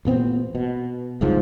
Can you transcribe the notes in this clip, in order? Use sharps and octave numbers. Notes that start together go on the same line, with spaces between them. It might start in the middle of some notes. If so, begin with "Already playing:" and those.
A1 A#2 B3 C4
B2
F#1 C2 G#2 F3